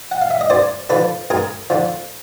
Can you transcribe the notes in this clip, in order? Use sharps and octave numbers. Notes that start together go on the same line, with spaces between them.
F#5
F5
E5
D#5
F#2 C5 D5
D3 F3 A4 B4
F#2 G#4 A#4
D3 F3